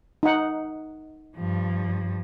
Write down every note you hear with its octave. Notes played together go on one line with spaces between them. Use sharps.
D#4 F#5
G2 F3